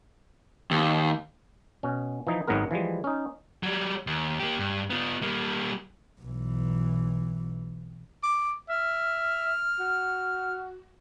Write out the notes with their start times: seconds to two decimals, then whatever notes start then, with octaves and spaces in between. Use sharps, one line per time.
0.71 D#2
1.83 B2 C#4
2.27 E3 F3 D#4
2.47 G#1 G#2 F#3 G#3 B3 A#4
2.71 E3 F3 G3 G#3
3.04 C#4 D#4
3.63 F#3 G3
4.07 D#2
4.40 A#3 G4
4.59 G2
4.90 B3 F4
5.22 G3 A#3
6.21 B1 E3
8.23 D6
8.69 E5 F6
9.79 F#4